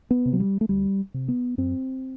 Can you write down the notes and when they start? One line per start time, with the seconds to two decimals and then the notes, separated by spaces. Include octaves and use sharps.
0.11 B3
0.25 C3
0.33 F#3
0.40 G3
0.61 A3
0.69 D2 G3
1.14 C3
1.28 B3
1.58 F#2 C4